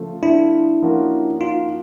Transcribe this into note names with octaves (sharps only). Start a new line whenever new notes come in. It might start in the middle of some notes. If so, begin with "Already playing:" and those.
Already playing: C#3 F3 A3
D4 E4
F3 A#3 C#4 F#4
D#4 F4